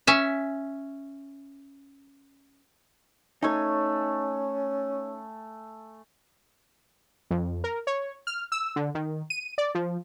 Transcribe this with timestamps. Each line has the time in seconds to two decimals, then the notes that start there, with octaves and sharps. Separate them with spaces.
0.07 C#4 E5
3.42 A3 C#4 D#4 C#5 G#5
7.31 F2
7.64 A#4
7.87 C#5
8.27 F6
8.52 E6
8.76 D3
8.95 D#3
9.30 D#7
9.58 D5
9.75 F3